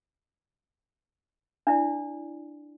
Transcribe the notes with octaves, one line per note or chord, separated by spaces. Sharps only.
D4 E4 D5